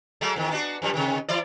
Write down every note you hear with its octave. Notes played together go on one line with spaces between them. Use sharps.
F#3 G#3 A3
E2 D#3
B3 D4 F#4
F#2 F3 G3
C3 D#3
E3 E4 D5